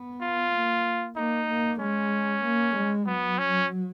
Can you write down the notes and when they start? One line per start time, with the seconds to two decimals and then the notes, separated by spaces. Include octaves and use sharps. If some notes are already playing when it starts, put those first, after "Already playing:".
Already playing: B3
0.22 F4
0.54 A#3
1.16 A#3 D#4
1.48 A#3
1.80 G#3 C#4
2.43 A#3
2.76 G#3
3.06 F#3 B3
3.38 C#4